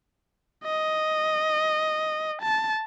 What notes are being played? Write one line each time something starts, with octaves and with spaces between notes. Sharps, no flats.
D#5
A5